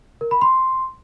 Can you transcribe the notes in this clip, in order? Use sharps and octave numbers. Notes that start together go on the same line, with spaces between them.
A#4
B5
C6